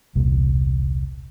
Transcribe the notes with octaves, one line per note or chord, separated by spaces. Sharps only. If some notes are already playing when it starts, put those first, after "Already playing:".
E1 C2 A#2